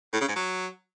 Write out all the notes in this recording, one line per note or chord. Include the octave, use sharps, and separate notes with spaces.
A2
C#3
G#2
F#3